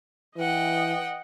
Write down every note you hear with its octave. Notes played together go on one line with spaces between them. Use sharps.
E3 D#5 F#5 G5